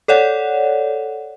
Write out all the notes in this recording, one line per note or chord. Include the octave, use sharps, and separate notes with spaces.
A4 C#5 D5 F#5